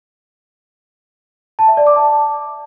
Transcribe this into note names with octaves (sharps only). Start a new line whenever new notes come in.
A5
E5
D5
D6
A5